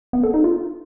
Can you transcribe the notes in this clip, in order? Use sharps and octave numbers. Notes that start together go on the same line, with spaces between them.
B3
A4
D#4
F4